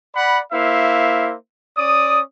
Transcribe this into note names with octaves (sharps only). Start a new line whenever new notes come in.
D5 F#5 B5
A#3 E4 C5 E5 F5
C#4 D5 D#6